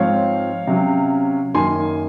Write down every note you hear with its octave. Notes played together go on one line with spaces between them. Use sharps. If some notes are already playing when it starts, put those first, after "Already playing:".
Already playing: G#2 F3 C4 C#5 F5
C3 F#3 C#4
F#2 D#3 A#3 G#5 C6